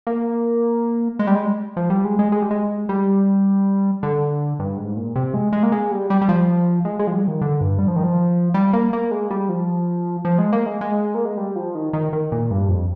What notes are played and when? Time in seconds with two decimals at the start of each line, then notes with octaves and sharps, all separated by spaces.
0.07 A#3
1.19 G#3
1.27 G3
1.35 G#3
1.77 F3
1.90 G3
2.04 G#3
2.19 G#3
2.32 G#3
2.42 G3
2.51 G#3
2.89 G3
4.03 D3
4.59 G2
4.77 G#2
4.96 A#2
5.16 C3
5.34 G#3
5.53 G#3
5.63 A#3
5.72 G#3
5.91 G3
6.10 G3
6.21 G3
6.29 F3
6.85 G#3
6.99 G#3
7.07 F3
7.13 G3
7.28 D#3
7.42 D3
7.61 G2
7.79 G3
7.88 F3
7.96 D#3
8.03 F3
8.54 G3
8.73 A#3
8.93 A#3
9.11 G#3
9.31 G3
9.49 F3
10.25 F3
10.38 G#3
10.53 A#3
10.66 G#3
10.81 G#3
11.15 A#3
11.25 G#3
11.37 G3
11.56 F3
11.75 D#3
11.93 D#3
12.13 D#3
12.32 A#2
12.51 G2
12.69 F2